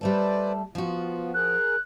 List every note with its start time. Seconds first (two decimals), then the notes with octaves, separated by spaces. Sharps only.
0.01 G3 A3 A4 B4 C5 D5
0.75 F3 B3 F4 F#4
1.34 G#4 A#4 F#6